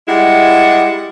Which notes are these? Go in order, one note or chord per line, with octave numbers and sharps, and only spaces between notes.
G3 G#3 E4 F#5